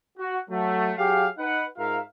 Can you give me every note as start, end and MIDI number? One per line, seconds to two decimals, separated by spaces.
0.18 0.38 66
0.50 0.93 54
0.50 0.93 57
0.97 1.27 54
0.97 1.27 67
0.97 1.27 68
0.97 1.27 77
1.38 1.64 63
1.38 1.64 71
1.38 1.64 78
1.77 1.99 44
1.77 1.99 65
1.77 1.99 70
1.77 1.99 76
1.77 1.99 77